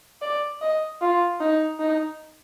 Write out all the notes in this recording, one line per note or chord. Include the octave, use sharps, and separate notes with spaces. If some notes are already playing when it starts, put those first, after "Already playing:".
D5
D#5
F4
D#4
D#4